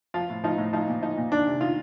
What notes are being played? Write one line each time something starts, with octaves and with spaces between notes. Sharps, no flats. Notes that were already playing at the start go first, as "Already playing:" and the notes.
F3 F4
A2
F3 D#4
A2
F3 D#4
A#2
F3 D#4
A#2
D#3 D4
C3
D#3 F4